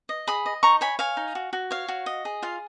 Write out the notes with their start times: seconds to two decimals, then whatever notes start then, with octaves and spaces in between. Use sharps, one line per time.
0.09 D#5
0.27 G#4 B5 D#6
0.46 D#5
0.63 D#4 A#5 C#6
0.81 C#5 G#5 B5
0.99 C#5 F5 G#5
1.17 D#4
1.35 F#4
1.53 F#4
1.71 C#5 F5
1.88 F#4
2.06 D#5
2.25 G#4
2.42 F4 F5